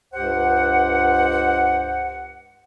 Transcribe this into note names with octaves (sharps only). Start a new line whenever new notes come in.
C#2 G2 G4 C5 F#5